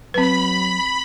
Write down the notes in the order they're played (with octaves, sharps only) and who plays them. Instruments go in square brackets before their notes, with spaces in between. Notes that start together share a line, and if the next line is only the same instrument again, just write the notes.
[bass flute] F#3 [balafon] C4 B4 [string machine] B5